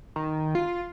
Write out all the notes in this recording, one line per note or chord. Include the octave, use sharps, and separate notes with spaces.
D#3
F4